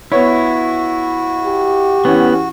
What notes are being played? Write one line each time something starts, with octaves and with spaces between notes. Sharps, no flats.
B3 E4 F#4 C#5
G4
E3 B3 C#4